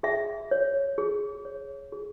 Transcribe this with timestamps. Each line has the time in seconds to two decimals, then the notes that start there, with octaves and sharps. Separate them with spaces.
0.03 G#4 E5
0.51 C#5
0.98 G#4
1.45 C#5
1.92 G#4